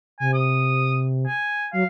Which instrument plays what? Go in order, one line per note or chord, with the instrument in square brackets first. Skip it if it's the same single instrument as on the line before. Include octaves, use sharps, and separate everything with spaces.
[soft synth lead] C3 [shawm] G#5
[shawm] D#6
G#5
[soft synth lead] F#3 [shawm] F5